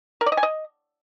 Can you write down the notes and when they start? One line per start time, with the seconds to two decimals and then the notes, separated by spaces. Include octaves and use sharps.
0.21 A#4
0.26 D5
0.32 D#5
0.37 G#5
0.43 D#5